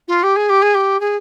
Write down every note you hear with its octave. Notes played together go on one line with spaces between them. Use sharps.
F4
G4
G#4
G4
G#4
G4
G#4